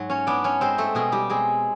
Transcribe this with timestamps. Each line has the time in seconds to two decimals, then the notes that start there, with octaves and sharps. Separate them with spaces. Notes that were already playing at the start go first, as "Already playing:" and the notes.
Already playing: G#2 F#3
0.10 C#4 C#5
0.27 B3 D4 D5
0.44 C#4 C#5
0.61 G#3 C4 C5
0.78 A3 A4
0.95 B2 G#3 G#4
1.12 G3 G4
1.30 G#3 C4 G#4